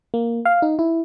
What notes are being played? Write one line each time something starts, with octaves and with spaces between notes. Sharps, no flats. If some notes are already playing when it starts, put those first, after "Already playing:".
A#3
F5
D#4
E4